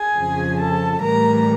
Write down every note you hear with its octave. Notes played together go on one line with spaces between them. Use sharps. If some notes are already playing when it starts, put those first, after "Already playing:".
Already playing: G#4 G#5
F2 C#3 F3
A4 A5
A2 E3 G3 A#4 A#5